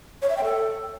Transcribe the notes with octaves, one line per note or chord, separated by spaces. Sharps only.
C#5
E5
G5
A4